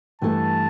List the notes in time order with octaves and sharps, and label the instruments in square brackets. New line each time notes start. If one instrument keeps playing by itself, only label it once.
[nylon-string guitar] G2 E3 A3 E4 A4 [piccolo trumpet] A5